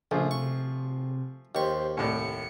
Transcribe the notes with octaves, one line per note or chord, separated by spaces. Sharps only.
A#1 C#3 F3 A3 G#4
C3 C#6
D#2 G4 C5 C#6
C2 A2 D5 C#7